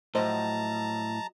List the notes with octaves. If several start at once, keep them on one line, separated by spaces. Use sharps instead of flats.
A2 F3 F#3 C5 D#5 A5 A#5